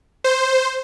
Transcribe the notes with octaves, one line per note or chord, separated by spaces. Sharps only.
C5